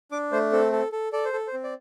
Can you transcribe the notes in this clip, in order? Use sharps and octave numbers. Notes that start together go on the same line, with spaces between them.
D4 D6
A3 C5
C4 A4
A4
A4
A4 D5
C5
A4
C5
C4
D5